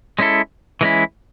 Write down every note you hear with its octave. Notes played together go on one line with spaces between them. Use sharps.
G#3 C#4 E4 A4
E3 G#3 C#4 E4